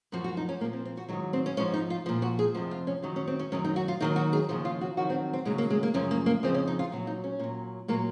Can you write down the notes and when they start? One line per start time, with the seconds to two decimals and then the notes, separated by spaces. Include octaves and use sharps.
0.12 F#2 F3 F#4
0.24 F#4
0.37 D#4
0.49 C#4
0.60 A#2 A#3
0.64 F3
0.73 C4
0.85 C4
0.97 F#4
1.09 G#2 D#3 F#3 D#4
1.33 C4
1.46 C#4
1.57 G#2 F3 C#4
1.74 D#4
1.90 F4
2.06 A#2 F3
2.22 F#4
2.39 G#4
2.55 F2 C3 F3 F#4
2.71 F4
2.87 C#4
3.02 F#2 D#3 F#3 D#4
3.16 C#4
3.28 C4
3.39 C#4
3.52 F#2 D#3 F#3 C#4
3.64 D#4
3.76 F#4
3.88 F4
4.00 D#2 D#3 F#3 D#4
4.16 F#4
4.33 G#4
4.49 D#2 C#3 F3 G#4
4.65 F4
4.81 F#4
4.97 F2 D#3 F#3 F#4
5.10 C4
5.33 C4
5.45 D#2 C#3 F#3 G#3
5.58 A#3
5.70 G#3
5.83 A#3
5.94 F#2 C#3 F3 C#4
6.11 A#3
6.26 A#3
6.43 F2 C#3 F3 C4
6.54 C#4
6.68 D#4
6.79 F4
6.91 A#2 F#3 F#4
7.07 D#4
7.24 C#4
7.39 A#2 F#3
7.88 A#2 F#3 A#3